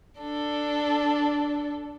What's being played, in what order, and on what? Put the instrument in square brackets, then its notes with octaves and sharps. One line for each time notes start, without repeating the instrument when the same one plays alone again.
[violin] D4 A4